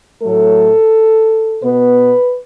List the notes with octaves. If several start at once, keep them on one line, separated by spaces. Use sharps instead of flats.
A2 F#3 A3 A4
B2 B3 B4